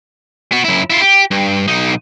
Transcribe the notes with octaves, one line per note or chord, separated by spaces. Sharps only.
B3 F#4
F#2 E4
E4 F4
G4
G2
B1 D#4